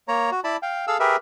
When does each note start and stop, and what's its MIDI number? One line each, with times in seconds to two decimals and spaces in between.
0.08 0.30 58
0.08 0.30 73
0.08 0.30 82
0.32 0.40 66
0.44 0.57 64
0.44 0.57 74
0.44 0.57 81
0.44 0.57 83
0.62 0.85 77
0.62 0.85 79
0.87 0.97 68
0.87 0.97 69
0.87 0.97 77
0.87 0.97 88
1.00 1.16 67
1.00 1.16 68
1.00 1.16 70
1.00 1.16 71
1.00 1.16 76